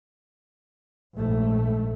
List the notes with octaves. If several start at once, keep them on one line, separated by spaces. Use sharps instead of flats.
A#1 G#2 A3